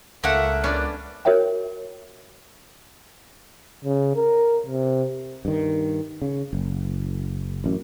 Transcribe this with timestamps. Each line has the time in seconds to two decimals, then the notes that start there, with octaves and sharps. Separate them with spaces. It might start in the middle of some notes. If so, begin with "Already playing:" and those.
0.24 C#2 A3 A#3 E5 F#5
0.64 B3 C#4 D4 D5
1.25 F#4 A#4 C#5 E5 G5
3.84 C#3
4.16 A#4
4.67 C3
5.45 G2 D#3
6.22 C#3
6.53 F#1
7.64 A1 F#2